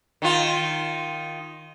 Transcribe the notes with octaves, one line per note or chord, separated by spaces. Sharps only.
D#3 F4